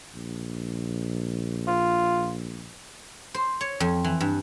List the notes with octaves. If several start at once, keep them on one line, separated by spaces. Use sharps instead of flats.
A#1
F4
C5
C#5
F2
E3
G2